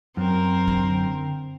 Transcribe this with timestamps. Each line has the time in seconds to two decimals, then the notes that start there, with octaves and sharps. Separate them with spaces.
0.17 F#2 C4 A#4
0.68 D3